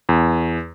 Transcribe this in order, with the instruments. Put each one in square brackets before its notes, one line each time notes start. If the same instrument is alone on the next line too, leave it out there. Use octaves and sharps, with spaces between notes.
[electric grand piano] E2